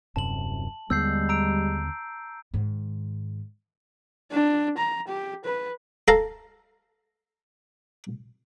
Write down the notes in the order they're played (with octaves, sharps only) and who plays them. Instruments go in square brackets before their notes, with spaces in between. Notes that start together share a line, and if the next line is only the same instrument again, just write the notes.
[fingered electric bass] D#1 F#2 C3 [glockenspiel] A5 F#7
[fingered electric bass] D#2 D3 B3 [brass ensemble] G3 G#3 [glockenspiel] E6 G6 C7
[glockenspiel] A#5 E6 D7
[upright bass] G#2 D#3
[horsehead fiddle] D4
A#5
G4
B4
[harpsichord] A4 F5 A#5